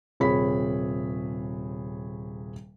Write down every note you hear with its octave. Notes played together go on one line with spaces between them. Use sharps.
D#1 C3 G#4 C#5 B5 B6